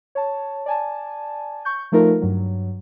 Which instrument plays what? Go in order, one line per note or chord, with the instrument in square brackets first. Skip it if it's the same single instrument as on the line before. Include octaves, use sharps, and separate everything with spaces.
[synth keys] C#5 A5
D5 G#5 A5
C#6 G6
F3 A3 D#4 F4 A#4
G2 F#3